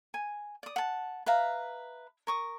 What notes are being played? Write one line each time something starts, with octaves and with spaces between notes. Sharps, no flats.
G#5
D5 D#6
F#5 A5
B4 E5 F5 A#5
A#4 C#6 D#6